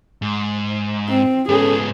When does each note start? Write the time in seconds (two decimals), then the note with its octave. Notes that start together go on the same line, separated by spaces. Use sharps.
0.22 G#2
1.09 C4
1.49 G#2 B3 C#4 G#4 A4